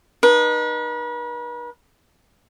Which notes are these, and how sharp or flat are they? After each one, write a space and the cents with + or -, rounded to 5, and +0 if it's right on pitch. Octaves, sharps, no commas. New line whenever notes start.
D#4 -30 B4 -40